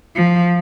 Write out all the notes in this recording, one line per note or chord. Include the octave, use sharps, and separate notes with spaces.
F3